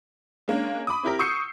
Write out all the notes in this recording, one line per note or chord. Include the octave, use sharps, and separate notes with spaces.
G#3 A#3 C#4 D4
B5 D6 D#6
C4 E4 G4 A#4
C#6 D#6 E6 G6 C7 C#7